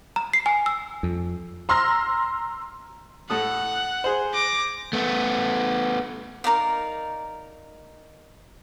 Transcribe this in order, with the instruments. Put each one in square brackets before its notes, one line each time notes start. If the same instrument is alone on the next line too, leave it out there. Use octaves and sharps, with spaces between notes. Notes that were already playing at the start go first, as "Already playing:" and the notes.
[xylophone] A#5
C7
G#5
E6
[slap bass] F2
[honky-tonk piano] A#5 C6 E6 F6 A#6
[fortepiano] A2 A4 D#6 [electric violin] F#5
[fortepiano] G#4 C5
[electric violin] D6 A#6
[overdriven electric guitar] A3 B3
[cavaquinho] D#4 A#4 D5 F5